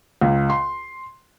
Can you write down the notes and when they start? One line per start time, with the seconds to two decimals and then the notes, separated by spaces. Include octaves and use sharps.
0.21 C#2
0.50 C6